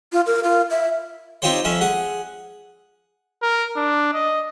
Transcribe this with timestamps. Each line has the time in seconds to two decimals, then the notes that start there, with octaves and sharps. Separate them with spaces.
0.13 F4
0.27 A#4
0.44 F4
0.70 E5
1.42 C4 D#4 F4 G4 C5 C#5
1.64 F2 C#4 E5 F5
1.81 G#4 F#5
3.42 A#4
3.76 D4
4.14 D#5